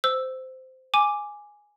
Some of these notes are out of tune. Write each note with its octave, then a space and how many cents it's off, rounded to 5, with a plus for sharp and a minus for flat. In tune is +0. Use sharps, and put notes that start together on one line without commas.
C5 -15 E6 +0
G#5 +0 D6 +0